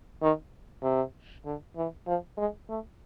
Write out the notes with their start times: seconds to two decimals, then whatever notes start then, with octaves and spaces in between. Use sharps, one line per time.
0.22 D#3
0.83 C3
1.45 D3
1.76 E3
2.06 F3
2.37 G#3
2.69 A3